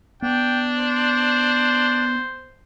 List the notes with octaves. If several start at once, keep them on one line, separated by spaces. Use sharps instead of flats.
B3 D4 G5
C5